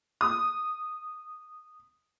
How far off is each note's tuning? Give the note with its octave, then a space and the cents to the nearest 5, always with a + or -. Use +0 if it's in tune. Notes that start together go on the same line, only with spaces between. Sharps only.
D#6 -10